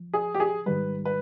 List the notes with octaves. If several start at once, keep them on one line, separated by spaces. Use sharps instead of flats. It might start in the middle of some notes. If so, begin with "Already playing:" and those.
Already playing: F3
G#4
G4
G#4
G#2 D#3 G3 B4
B4